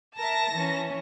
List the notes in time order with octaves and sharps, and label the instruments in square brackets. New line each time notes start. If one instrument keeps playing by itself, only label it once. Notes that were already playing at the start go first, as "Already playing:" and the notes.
[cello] A#4 E5 [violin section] A5 A#6
[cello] E3 C#4